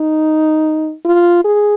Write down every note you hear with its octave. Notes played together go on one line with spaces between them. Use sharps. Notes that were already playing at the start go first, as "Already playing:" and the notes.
Already playing: D#4
F4
G#4